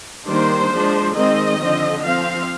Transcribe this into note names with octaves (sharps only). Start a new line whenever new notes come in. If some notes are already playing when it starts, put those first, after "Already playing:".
D#3 G3 A#3 D4 C5
F3 G#3 D4
D#3 G#3 C4 D#5
D3 F3 C4
F3 C4 F5